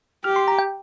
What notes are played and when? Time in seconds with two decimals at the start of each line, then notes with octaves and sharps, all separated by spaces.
0.24 G4 F6
0.36 C6
0.48 A#5
0.59 G5